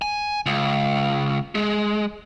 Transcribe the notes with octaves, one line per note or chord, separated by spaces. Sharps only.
G#5
C#2
G#3